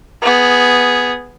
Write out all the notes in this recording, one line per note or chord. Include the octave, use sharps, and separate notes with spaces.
B3 G#4